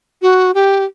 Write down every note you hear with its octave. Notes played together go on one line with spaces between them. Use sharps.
F#4
G4